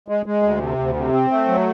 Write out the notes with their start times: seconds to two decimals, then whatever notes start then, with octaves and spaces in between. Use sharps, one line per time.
0.08 G#3
0.26 G#3
0.42 D2
0.61 C3
0.79 D2
0.96 C3
1.13 C4
1.31 A3
1.48 F#3